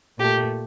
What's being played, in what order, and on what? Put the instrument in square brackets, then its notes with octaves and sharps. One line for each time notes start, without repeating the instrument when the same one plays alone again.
[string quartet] A#2 A3 G4